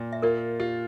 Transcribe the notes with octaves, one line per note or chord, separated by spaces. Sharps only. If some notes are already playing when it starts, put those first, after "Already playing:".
Already playing: A#2
E5
F4 A#4 D5
F4 G4